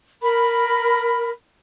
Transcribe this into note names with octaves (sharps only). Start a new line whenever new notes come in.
A#4 B5